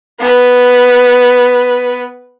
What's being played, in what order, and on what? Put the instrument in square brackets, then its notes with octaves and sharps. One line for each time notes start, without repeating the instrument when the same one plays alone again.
[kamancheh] B3 B4